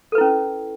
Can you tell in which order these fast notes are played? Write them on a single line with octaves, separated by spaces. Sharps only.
A4 B4 E4 C#4